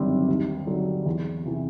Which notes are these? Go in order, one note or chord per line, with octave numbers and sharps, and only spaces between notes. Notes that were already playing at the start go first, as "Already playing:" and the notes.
Already playing: G1 F#2 D#3 G3 C4
D#2
D3 F#3
E2
C3 E3